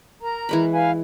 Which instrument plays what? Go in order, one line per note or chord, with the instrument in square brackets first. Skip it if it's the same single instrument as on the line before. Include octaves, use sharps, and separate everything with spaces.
[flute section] A#4 A#5
[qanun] E3 G#3 B5
[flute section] B4 F5 G#5